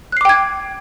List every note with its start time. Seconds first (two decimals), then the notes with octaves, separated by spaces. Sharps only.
0.12 F#6
0.17 C7
0.21 D6
0.25 G5
0.29 G#6